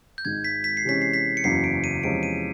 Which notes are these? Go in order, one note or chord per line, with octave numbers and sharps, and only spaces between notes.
G6
G#1 G#2 D#3 G#3 G#6
B6
B6
C7
C3 E3 G#3 C#4 B6
C7
B6
C#7
F#1 E2 C#3 F#3 C7
D7
D#7
E2 C3 F3 G#3 C#4 D7
D#7